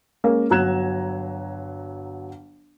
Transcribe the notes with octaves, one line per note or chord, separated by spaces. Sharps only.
G#3 A#3 C#4 A#4
G1 F#3 A#5 F#6 G#6 E7